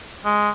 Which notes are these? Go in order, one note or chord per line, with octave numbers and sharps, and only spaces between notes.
G#3